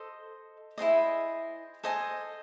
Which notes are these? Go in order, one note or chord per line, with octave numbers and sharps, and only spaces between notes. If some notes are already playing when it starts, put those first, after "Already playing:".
Already playing: A4 C5 D#5
E4 G#4 C5 D#5
A4 C5 D#5 G#5